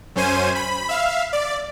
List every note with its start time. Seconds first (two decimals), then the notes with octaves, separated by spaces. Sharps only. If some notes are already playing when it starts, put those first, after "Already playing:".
0.16 F#2 C#4 C5 G#5 D#7
0.55 B5
0.89 E5 F5
1.33 D5